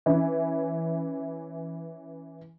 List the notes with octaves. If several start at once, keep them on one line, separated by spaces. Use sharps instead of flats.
E3 C#4 E4